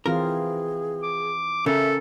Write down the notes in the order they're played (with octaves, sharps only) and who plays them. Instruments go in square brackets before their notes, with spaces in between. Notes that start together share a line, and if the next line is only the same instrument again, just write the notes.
[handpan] E3 C4 F4 [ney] G#4 [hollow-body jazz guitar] A#4
[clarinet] D6
[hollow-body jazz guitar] C#3 [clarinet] A4 [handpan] A#4 [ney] E5